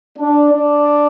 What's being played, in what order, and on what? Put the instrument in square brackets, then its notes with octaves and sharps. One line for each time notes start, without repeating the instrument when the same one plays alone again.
[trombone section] D4
D4